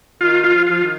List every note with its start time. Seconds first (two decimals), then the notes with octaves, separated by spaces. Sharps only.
0.21 D#3 F4
0.44 F4
0.51 F3
0.67 F3 F4
0.81 D#3